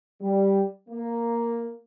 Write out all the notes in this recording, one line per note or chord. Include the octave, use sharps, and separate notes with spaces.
G3
A#3